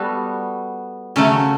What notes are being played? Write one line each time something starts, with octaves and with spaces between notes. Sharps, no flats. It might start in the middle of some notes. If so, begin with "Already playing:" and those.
Already playing: G3 B3 F#4 A4
C#3 F#3 A3 C#4